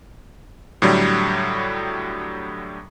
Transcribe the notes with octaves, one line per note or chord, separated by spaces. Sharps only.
A2 D3 F#3 G3